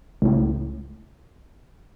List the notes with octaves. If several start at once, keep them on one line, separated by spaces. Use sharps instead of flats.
C#2 A2